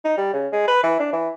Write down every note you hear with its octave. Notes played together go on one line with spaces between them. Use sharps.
D#4
G3
C#3
G#3
B4
E3
D4
E3